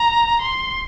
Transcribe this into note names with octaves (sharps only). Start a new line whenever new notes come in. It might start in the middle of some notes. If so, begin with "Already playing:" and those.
Already playing: A#5
C6